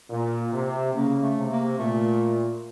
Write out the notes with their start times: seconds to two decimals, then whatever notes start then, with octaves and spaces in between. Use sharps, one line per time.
0.10 A#2 A#3
0.53 C3
0.94 C#3 A#3
1.22 A3
1.37 C3
1.51 A#3
1.78 A#2 A3